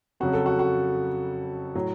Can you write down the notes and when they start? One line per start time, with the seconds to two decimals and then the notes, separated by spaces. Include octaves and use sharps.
0.20 F2 C#3 F#3 F#4
0.33 A4
0.46 F#4
0.59 F#4
1.75 A2 F#3